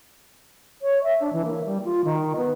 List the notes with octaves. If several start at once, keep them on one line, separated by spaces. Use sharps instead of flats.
C#5
E5
D4
E3
A#3
G3
F4
D#3
B3